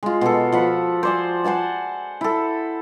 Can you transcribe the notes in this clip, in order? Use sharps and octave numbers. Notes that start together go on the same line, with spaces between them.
G#3 F4
B2 A4
F3 F#5 B5
C5 D5 G#5
C5 F#5 G#5 A5
E4 A4